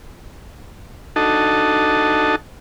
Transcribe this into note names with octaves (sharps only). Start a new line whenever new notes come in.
D4 D#4 F#4 A4 D#5 A5